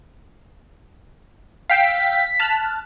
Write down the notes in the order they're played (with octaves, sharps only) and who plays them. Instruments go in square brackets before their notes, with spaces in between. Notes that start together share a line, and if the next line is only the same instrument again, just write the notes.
[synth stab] F5 G5 E6 [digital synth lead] B6
[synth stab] A5 F6 F#6